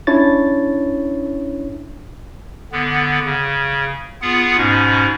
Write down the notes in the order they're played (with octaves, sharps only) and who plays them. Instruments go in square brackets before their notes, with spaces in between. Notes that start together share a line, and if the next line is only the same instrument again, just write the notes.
[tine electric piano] C#4 D4 E4 C#5 A6
[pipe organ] D3 B3
C#3
B3 F4 G#4 F#5
G#2 B2 C#4